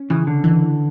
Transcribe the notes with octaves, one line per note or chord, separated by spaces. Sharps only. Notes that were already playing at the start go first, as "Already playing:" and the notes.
Already playing: C#4
C#3 E3
D3
E3